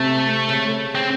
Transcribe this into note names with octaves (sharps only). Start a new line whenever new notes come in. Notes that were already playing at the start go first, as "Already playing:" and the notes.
Already playing: C3 A3
C#3
C4